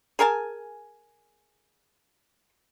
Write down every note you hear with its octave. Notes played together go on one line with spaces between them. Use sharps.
G#4 A#4 G#5 A5